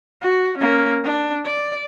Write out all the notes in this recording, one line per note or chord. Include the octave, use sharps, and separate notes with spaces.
F#4
A#3 C#4
D4
D5